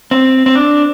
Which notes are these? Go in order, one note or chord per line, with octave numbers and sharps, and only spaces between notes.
C4
C4
D4